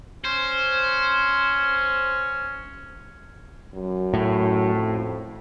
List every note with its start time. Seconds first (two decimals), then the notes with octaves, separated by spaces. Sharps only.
0.25 C#4 C5
3.74 F#2
4.14 A2
4.74 F2